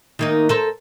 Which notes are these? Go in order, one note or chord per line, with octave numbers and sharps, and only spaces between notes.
D#3 A#3 D#4
A4 A#4 C5